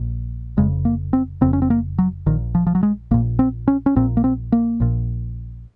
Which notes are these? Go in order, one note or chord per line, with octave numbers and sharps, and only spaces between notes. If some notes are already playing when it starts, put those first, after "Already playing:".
Already playing: A#1 A#2
F1 F2 C#3 G#3
A#3
C4
F1 F2 C#3 C4
C#4
C4
A#3
F#3
A#1 A#2 D#3
F3
F3
F#3
G#3
A#1 A#2 A#3
C4
C#4
C#4
A#1 A#2 C4
A#3
C4
A#3
A#1 A#2